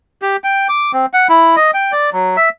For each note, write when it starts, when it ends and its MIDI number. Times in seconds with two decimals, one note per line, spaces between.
0.22 0.36 67
0.44 0.67 79
0.69 0.92 86
0.93 1.06 60
1.13 1.27 78
1.29 1.56 64
1.56 1.71 75
1.74 1.92 79
1.92 2.10 74
2.13 2.37 54
2.37 2.49 76